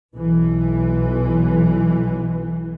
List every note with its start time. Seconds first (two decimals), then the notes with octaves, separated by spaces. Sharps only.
0.16 B1 E3